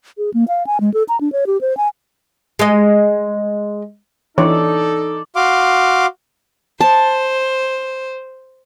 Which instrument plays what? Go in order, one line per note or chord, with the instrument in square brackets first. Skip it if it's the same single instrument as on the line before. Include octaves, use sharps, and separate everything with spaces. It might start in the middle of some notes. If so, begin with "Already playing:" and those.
[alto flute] G#4
A#3
F5
G#5
G#3
A4
A#5
D4
C#5
G4
C5
G#5
[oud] G#3 D#5
[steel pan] E3 D4 C#5 [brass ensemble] D#4 A4 [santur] D5
[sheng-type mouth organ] F#4 F5 C6 D6
[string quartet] C5 [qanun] A5